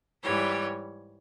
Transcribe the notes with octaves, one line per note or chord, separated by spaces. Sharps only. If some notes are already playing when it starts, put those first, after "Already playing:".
G#2 E3 G3 C#5